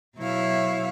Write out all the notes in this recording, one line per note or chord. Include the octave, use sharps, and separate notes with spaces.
B2 F#3 E4 C#5 E5 F5